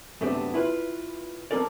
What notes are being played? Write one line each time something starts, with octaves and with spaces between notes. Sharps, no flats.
F#2 C3 A3 B3 C4 D4
E4 F4 B4
F3 A#3 C4 A4 A#4 D5